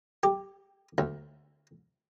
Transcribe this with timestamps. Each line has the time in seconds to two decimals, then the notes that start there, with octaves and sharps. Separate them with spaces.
0.23 G4
0.98 D2